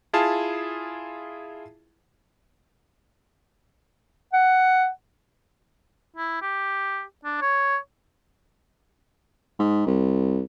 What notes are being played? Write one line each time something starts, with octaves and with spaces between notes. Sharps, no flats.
E4 F4 G#4 F5 A5
F#5
E4
G4
D4
C#5
G#2
C2